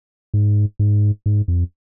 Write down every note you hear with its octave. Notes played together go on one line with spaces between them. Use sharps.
G#2
G#2
G#2
F2